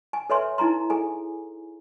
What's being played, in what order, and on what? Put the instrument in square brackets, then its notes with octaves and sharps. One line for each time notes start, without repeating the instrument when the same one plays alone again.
[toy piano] G#5
A4 B4 C#5 E5 G#5 C6
D#4 E4 G#5 A#5 C6
G#4 A4 G#5